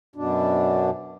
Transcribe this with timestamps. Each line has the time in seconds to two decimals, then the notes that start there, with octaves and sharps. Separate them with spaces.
0.16 F#2 B2 D4